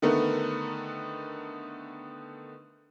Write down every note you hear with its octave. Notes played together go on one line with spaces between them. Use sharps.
D3 D#3 A3 B3 A#4